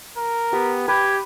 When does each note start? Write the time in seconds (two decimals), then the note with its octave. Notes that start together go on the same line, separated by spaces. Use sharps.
0.17 A#4
0.53 B3 G4
0.88 G4 B4 G#6